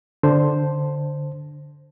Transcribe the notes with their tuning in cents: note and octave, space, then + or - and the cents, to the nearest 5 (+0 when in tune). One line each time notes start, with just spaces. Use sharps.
D3 +0 C5 +0 A5 +0